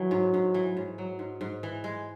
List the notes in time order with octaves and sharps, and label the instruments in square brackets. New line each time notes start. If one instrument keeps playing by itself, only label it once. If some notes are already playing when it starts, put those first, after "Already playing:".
Already playing: [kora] E3 [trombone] F#3
[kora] G#2
G#2
E3
G#2
F#3
G#2
G#2
E3
G#3